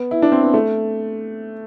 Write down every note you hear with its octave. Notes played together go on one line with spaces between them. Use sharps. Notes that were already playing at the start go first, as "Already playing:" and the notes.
Already playing: B3
E4
D4
C4
B3
A3